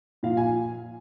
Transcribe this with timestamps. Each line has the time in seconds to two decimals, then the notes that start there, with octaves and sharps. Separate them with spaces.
0.23 A#2 F3 F5
0.37 G#5